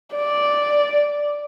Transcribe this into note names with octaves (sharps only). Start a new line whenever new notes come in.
D5